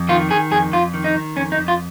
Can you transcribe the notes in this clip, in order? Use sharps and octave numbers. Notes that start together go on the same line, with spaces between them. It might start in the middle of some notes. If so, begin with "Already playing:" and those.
Already playing: F2
D#3 F4
D#3 G#4
F2 G#4
F2 F4
D#3
D#4
D#3
F2 C#4
D#4
F2
F4